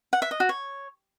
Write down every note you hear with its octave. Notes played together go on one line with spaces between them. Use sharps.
F#5
E5
D#5
F#4
C#5